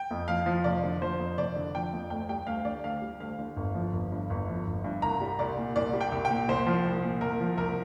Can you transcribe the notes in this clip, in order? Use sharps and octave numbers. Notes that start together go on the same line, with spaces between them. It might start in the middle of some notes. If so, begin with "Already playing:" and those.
Already playing: G5
F2
F3 F5
F3
F1 D5
D3
F3 C5
F2
F1 D5
D3
F3 G5
F2
D2 G5
G3 G5
D2 F5
D3 D5
D2 F5
G3
D2 F5
D3
G1
F3
G1
G2
G1
F3
G1
G2
C2 A#5
G3
C2 D5
A#2
C2 D5
G3
G5
C2
G5
A#2
C2 C5
F3
C2
A#2
C2 A#4
F3
C2 A#4